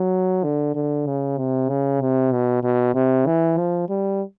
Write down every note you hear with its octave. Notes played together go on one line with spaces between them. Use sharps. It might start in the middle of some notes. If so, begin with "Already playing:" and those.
Already playing: F#3
D3
D3
C#3
C3
C#3
C3
B2
B2
C3
E3
F3
G3